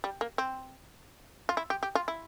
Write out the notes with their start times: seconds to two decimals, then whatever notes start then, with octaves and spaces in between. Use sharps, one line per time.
0.04 G3
0.21 A#3
0.38 C4
1.49 F4
1.57 E4
1.70 G4
1.83 G4
1.95 F4
2.08 E4